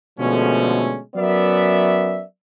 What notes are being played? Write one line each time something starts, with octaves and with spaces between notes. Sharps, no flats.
B2 D3 F3 G#3 A3 C#4
F#3 B3 C#4 A#4 D5 E5